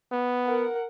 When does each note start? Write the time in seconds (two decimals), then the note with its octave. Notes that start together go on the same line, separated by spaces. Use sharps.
0.12 B3
0.46 A#4 F#5